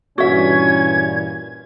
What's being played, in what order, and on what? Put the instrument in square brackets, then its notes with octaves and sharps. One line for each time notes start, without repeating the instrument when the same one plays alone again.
[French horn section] G2 A#2 E3 [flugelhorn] C#4 [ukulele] F#4 E5 [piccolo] G#6